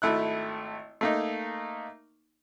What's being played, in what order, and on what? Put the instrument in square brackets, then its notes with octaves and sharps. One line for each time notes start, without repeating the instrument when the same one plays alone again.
[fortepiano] G#1 A3 E4 F#6
A3 A#3 D#4